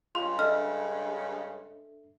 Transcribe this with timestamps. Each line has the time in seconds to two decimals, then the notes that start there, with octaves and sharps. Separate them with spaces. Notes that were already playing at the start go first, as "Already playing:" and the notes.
0.15 G2 C#3 G#3 F4 C6
0.39 D4 A4 D#5 E5 F6